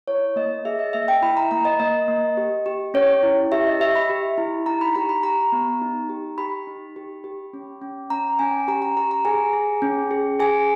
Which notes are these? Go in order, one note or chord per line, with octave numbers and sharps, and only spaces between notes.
E4 C#5
A#3 D#5
G#4 E5
D#5
A#3 E5
G5
E4 B5
A#5
A#3 A#5
D#5
A#3 D#5
A#3
G4
G4
C#4 C#5
E4
G4 E5
D#5
G4 E5
B5
G4
E4
D#4 A#5
B5
G4 A#5
B5
G4 A#5
B3
D#4
G4
G4 B5
D#4
G4
G4
C#4
C#4
C#4 A#5
C#4 G#5
G4 A#5
A#5
G4 A#5
A#5
G#4 G#5
G#4
C#4
G#4
G#4 G#5